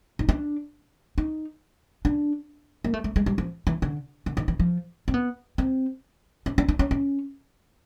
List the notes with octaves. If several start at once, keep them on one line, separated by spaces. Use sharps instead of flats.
D#4
D4
D#4
D4
A#3
A3
A3
G#3
G3
F3
E3
D3
D3
D#3
E3
F3
C4
B3
C4
C#4
D4
D4
C#4
C#4